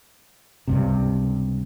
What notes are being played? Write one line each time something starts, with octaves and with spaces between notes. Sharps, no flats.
C#2 G2 C3